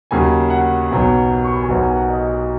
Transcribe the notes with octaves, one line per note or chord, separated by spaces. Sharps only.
D#2 C#3 F#3 G#5
F#5
B1 B2 F#3
C#6
B5
G#5
B1 B2 F#3 F#5
G#5
F#5
D#5